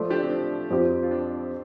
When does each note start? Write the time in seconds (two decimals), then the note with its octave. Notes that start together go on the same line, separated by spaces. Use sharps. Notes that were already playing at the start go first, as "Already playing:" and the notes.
Already playing: F3 A3 F4 D5
0.10 D4 G4
0.22 C4
0.30 D4
0.70 F2 F3 C4 G4
1.03 F4
1.11 D4